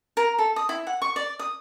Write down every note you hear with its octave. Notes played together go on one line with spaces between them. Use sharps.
A#4
A4
D#6
E4
F#5
C#6
D5
D#6